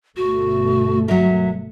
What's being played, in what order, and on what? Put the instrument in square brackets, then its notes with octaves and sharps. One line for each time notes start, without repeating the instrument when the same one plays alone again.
[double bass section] G1 B2 A3 [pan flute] F#4
[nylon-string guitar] F#3 A#4 [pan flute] E5